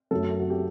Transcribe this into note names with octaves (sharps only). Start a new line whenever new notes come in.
F#2 F#3 A3 A4
F#4
G4